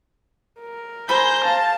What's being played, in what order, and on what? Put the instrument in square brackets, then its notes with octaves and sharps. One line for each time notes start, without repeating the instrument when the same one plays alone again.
[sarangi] A#4
[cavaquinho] G#4 G#5 B5 [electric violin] C5 A#5 [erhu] G6
[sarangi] F5 [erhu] A5